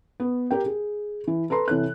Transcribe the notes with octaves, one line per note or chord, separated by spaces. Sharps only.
B3
G4 A#4 G5
G#4
E3
A4 B4 A#5 C6
C3 E3 A4 C#5 F#6